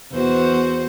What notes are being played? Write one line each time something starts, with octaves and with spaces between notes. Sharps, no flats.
E2 F#4 C5